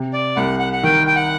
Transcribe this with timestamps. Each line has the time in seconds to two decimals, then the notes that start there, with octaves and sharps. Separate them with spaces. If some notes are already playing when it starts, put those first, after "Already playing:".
Already playing: C3
0.13 D5
0.36 C2 F#5
0.59 F#5
0.73 F#5
0.83 D#3 G5
1.07 G5
1.16 F#5